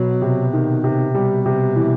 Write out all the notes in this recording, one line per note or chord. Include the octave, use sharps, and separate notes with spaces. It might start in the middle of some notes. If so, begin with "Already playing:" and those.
Already playing: B2 F#3
C3
D#3
C3
B2 G3
C3
E3